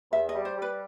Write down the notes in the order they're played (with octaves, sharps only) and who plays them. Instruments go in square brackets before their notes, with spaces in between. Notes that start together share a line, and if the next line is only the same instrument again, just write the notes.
[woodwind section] E2 [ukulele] E5
[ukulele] D#5
[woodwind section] G3
[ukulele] C5
[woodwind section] G3 [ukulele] B4